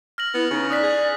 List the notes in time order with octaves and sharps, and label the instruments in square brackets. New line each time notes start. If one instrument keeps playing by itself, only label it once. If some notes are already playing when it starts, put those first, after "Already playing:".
[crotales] F6 A#6 F#7
[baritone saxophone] B3 [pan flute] E4
[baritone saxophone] C#3 [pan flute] D#4
[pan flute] D5 [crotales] D#6 F#6 B6
[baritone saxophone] G#4